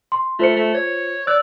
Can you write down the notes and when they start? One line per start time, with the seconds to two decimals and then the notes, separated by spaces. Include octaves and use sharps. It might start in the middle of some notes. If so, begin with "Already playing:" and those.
0.12 C6
0.39 A3 F4 C5 C#7
0.57 A3
0.75 C#5
1.27 D5 E6 F#6